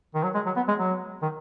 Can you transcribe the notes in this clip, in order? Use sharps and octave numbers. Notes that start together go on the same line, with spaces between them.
D#3
F#3
G#3
F#3
B3
G#3
F#3
D#3